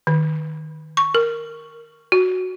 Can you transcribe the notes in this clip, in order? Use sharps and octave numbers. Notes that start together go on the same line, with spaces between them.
D#3
C#6
A#4
F#4